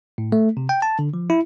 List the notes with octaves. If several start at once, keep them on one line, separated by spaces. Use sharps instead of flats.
A2
A3
C3
G5
A5
D3
F3
E4